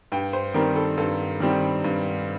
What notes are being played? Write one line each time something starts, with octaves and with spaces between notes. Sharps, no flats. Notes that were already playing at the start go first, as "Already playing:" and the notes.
G2 G5
C5
D#3 G3 C4 A#4
A4
G2 A4
D#3 G3 C4
G2